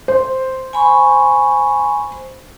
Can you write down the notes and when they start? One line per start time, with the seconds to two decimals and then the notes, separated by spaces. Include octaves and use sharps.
0.08 C5
0.73 G#5 B5 C#6